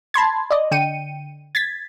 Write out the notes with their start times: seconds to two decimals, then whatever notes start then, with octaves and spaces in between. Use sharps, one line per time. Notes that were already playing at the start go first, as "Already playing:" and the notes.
0.14 A5 B5 C6 G#6
0.51 D5 D#5
0.71 D3 G5 C#7 D#7
1.55 G#6 A6 B6